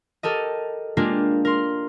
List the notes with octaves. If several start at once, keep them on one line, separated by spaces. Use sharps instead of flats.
G4 A4 A#4 D#5
G#3 A#3 D4 F4 G4 A#4
A#4 C6